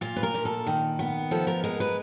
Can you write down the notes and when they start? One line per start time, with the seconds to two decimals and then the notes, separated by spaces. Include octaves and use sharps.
0.01 A#2 F4
0.16 B4
0.23 A#4
0.34 A#2
0.45 A4
0.67 D#3
0.99 B3
1.31 F3 A4
1.47 A#4
1.64 G#3 A#4
1.80 B4